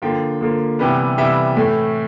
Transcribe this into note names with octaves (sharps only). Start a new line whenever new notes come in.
D3 F3 A#3 G5
D3 F3 A#3
C3 E3 G3 B3
C3 E3 G3 B3 E5
A2 E3 A3